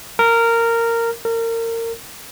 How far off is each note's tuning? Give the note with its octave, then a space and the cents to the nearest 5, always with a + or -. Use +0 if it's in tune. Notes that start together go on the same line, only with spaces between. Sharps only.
A#4 -15
A#4 -30